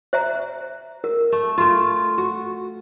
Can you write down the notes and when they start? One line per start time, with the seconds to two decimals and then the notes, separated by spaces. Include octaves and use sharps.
0.13 C5 E5 A#5
1.04 A#4
1.32 A3
1.58 A3 F4
2.18 F#4